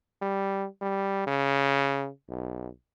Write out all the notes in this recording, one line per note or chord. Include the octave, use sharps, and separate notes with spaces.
G3
G3
C#3
B1